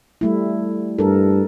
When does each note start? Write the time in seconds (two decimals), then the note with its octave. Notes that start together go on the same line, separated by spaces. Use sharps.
0.21 G3 A3 E4
0.99 G2 A4 A#4